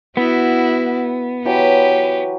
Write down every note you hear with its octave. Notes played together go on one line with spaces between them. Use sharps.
B3 E4 F#4
E3 F#3 G4 B4